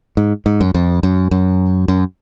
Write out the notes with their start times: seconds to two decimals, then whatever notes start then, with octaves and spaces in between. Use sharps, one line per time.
0.17 G#2
0.46 G#2
0.61 F#2
0.75 F2
1.03 F#2
1.31 F#2
1.88 F#2